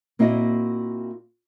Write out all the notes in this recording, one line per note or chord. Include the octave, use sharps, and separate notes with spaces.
A#2 A#3 C4 E4 F#4 D#5